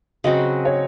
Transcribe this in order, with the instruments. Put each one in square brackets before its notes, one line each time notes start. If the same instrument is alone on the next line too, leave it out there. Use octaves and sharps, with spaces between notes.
[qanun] C#3 F#3 C4 F#4 [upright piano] D#5
[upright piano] C#5